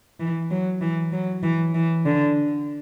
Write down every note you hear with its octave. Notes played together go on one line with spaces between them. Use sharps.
E3
F#3
E3
F#3
E3
E3
D3